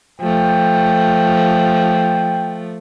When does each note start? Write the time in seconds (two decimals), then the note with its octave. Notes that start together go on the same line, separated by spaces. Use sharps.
0.20 F3 A3 G5